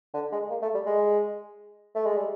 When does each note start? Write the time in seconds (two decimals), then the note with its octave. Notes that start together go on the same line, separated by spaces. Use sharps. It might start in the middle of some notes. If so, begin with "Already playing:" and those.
0.14 D3
0.32 G#3
0.50 A#3
0.62 A3
0.75 G3
0.86 G#3
1.95 A3
2.06 G#3
2.17 G3